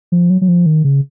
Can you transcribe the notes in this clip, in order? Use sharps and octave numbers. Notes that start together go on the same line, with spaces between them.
F3
F#3
F#3
F3
D#3
C#3